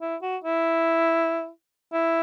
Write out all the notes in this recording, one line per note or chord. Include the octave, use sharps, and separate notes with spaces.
E4
F#4
E4
E4